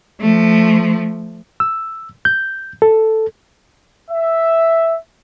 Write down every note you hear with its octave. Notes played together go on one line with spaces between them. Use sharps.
F3 A3
E6
G6
A4
E5